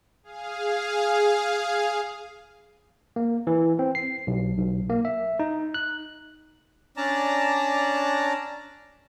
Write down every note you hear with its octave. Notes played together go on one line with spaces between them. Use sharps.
G#4 F5
A#3
E3
C4
C7
B1
B1
A#3
E5
D#4
F#6
C#4 D4 D5 A5 A#5